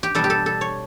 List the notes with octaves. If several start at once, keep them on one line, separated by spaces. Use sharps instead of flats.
G4
B2 G3 B3 A4
G4
A4
A4
C#5